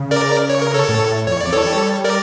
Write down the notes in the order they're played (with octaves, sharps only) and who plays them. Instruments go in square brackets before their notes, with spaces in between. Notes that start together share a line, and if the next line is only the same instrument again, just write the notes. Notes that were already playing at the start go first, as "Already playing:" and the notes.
Already playing: [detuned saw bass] C#3
[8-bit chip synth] A#4 D5
C#5
A#4
A4 C#5
[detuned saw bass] A2
[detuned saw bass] F2 [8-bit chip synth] C#5
[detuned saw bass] E2
[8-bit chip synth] D5
[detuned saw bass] F2
[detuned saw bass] E3 [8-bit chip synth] A4 C#5
[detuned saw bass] G3
[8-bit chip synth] A#4 D5